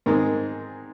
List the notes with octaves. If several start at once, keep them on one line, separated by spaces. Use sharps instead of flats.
G#2 D#3 G#3 C4 A#4